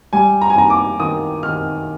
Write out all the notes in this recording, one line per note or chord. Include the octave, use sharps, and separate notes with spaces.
G3 G#5
A#5
G#5
D#2 A#5
D6
D#3 D#6
D#3 F6